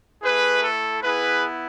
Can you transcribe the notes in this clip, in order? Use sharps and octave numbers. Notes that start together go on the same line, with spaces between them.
A3 E4 G#4 B4
A4
B3 E4 G#4 B4